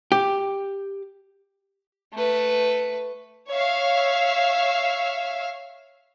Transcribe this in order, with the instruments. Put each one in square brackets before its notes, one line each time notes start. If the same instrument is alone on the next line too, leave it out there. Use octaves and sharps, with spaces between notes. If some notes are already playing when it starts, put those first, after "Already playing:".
[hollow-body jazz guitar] G4
[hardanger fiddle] A3 B4
[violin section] C#5 E5 F5